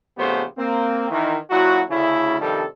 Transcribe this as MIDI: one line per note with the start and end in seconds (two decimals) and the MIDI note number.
0.18 0.43 34
0.18 0.43 49
0.18 0.43 57
0.18 0.43 59
0.18 0.43 67
0.18 0.43 72
0.58 1.07 58
0.58 1.07 60
1.10 1.37 51
1.10 1.37 52
1.50 1.81 46
1.50 1.81 54
1.50 1.81 64
1.50 1.81 66
1.90 2.36 38
1.90 2.36 49
1.90 2.36 64
2.41 2.63 43
2.41 2.63 48
2.41 2.63 51
2.41 2.63 53
2.41 2.63 55
2.41 2.63 69